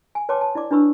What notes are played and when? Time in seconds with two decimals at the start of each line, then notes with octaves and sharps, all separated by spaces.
0.15 G#5
0.29 B4 C#5 G5 A5 C6 D6
0.41 A5
0.55 E4 D5 D6
0.71 D4 E4 B4 B5 C#6 E6